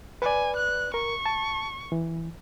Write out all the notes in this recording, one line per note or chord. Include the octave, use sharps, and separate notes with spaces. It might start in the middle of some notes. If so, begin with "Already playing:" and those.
B4 D5 G#5
F#6
A#4 C#6
A5
E3